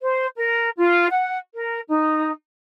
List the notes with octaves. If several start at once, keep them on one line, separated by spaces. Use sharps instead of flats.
C5
A#4
F4
F#5
A#4
D#4